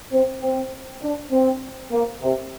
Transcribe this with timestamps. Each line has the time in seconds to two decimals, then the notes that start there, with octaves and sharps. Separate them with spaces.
0.12 C4
0.41 C4
1.02 D4
1.31 C4
1.92 A#3
2.22 C3